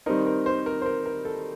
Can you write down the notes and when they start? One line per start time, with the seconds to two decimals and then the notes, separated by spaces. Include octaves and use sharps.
0.06 D#3 G3 C4 D#4 A#4
0.26 A#4
0.46 C5
0.66 A#4
0.82 C5
0.86 A#4
1.06 A#4
1.25 A4